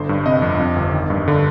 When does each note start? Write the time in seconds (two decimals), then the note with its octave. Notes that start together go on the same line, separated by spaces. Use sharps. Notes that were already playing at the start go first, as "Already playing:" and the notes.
Already playing: G1 D3 C5
0.09 G2
0.26 C3 D#5
0.42 F2
0.59 F2
0.76 G1
0.93 D#3
1.10 G2
1.28 D3